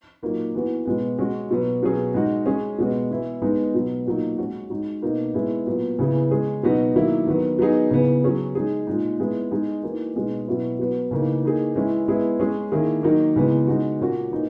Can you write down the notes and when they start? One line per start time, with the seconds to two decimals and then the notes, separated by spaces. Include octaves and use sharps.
0.22 A#2 F#3 A#3 D#4
0.54 E3 B3 F#4
0.85 B2 G#3 B3
1.18 G#3 C#4 F#4
1.51 B2 F#3 B3
1.83 B2 F#3 C#4 G#4
2.14 G#3 D#4 F#4
2.46 G#3 C#4 G#4
2.78 B2 G#3 B3 F#4
3.11 E3 B3 E4
3.42 G#3 B3 D#4
3.74 B2 F#3 B3
4.06 A#2 F#3 A#3 D#4
4.38 G#3 C#4 F#4
4.70 G#3 D#4 F#4
5.02 B2 A#3 D#4
5.34 G#3 B3 E4 G#4
5.67 A#2 F#3 B3
5.99 C#3 E3 B3 E4 G#4
6.31 G#3 C#4 G#4
6.63 B2 F#3 B3 D#4 F#4
6.95 D#3 F#3 A#3 E4
7.27 D#3 F#3 B3
7.59 F#3 B3 D#4 G#4
7.91 C#3 E3 B3
8.24 F#3 C#4 G#4
8.55 G#3 D#4 G#4
8.87 A#2 G#3 D#4
9.20 G#3 B3 E4 G#4
9.51 G#3 D#4 G#4
9.83 E3 A#3 D#4 F#4
10.16 B2 G#3 D#4 G#4
10.48 B2 F#3 C#4 E4
10.79 F#3 B3 F#4
11.11 C#3 E3 A#3 D#4
11.43 E3 A#3 D#4 G#4
11.75 E3 G#3 C#4 E4
12.08 G#3 B3 E4 G#4
12.40 G#3 C#4 G#4
12.72 D#3 A#3 E4 G#4
13.03 D#3 F#3 A#3 D#4
13.36 C#3 E3 G#3 B3
13.67 G#3 D#4 F#4
13.99 A#2 A#3 C#4 F#4
14.31 E3 A#3 D#4